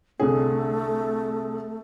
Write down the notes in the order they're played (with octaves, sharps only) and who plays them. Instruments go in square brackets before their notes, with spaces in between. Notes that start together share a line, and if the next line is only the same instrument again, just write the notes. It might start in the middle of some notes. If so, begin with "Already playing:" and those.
[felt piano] C2 D3 G#4 [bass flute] A3